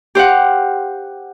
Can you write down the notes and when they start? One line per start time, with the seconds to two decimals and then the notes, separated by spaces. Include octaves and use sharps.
0.15 G4 C5 F5 F#5